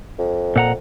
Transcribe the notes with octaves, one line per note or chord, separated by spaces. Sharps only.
F2
A#2 F#5 A#5